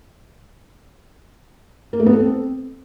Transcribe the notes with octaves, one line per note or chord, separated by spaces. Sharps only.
A#3
A3
B3
A4
C4